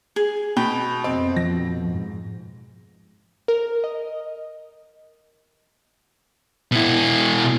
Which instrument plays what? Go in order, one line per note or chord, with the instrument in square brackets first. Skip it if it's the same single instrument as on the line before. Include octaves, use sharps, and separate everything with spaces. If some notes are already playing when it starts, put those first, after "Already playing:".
[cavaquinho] G#4
[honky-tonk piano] B2 [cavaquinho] G5 B5
[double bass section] F2 B2 [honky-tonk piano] C4 [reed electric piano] D#5
[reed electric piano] F3 [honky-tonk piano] A#6
[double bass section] G#2
[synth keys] A#4
D#5
[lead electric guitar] B2 E4